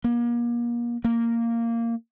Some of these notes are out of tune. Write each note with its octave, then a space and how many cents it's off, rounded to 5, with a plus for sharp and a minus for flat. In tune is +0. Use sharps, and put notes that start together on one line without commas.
A#3 +35
A#3 -10